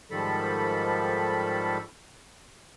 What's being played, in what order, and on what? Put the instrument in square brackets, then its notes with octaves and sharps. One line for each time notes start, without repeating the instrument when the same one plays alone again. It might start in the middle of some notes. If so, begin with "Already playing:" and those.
[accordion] G#2 D#3 F3 G3 A4 B5